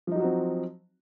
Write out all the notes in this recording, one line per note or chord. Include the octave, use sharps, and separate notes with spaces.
F3 F#3 C4 D#4 F#4